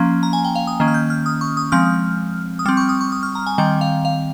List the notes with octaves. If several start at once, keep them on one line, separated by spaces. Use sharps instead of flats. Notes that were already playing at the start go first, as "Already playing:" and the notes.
Already playing: F3 A#3 C#4
A#5
G#5
G5
F5
D#6
D#3 A#3 C#4
F6
G6
F6
D#6
C#6
D#6
F3 G#3 C4 F6
D#6
G3 C4 F6
C#6
D#6
C#6
D#6
F6
A#5
G#5
D#3 G3 C4 G5
F5
F5